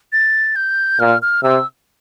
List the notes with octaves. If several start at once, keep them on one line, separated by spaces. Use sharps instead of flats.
A6
G6
A#2 F6
F6
C3 E6